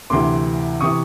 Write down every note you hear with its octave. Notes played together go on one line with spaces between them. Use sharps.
D2 C3 E3 C6 D6
C3 E3 C#6 D#6